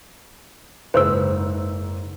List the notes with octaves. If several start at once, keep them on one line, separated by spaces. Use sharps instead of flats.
F#1 G#2 B4 C5 E6